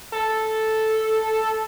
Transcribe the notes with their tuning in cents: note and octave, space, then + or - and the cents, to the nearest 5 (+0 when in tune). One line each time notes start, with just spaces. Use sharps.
A4 -5